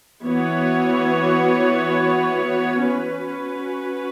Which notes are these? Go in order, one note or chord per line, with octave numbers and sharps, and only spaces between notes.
E3 B3 F#4 C#5
C#4 F#4 B4